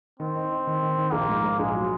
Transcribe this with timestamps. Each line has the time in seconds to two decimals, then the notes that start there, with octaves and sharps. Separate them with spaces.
0.20 D#3 C4
0.36 D#4
0.51 D#4
0.67 D#3
0.82 D#3
0.98 D#3
1.12 A#1 A#3
1.29 G#2
1.44 G#2
1.59 A#1 G#3
1.75 F#3